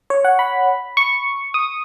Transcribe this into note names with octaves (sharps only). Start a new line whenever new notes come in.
C#5
F#5
B5
C#6
D#6